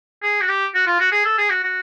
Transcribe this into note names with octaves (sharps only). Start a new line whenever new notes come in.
G#4
F#4
G4
F#4
F4
F#4
G#4
A4
G#4
F#4
F#4